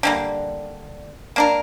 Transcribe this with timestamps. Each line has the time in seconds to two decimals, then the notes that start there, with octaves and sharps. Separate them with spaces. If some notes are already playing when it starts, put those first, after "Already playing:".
0.03 D3 G3 A#3
1.36 A#3 D4 A#4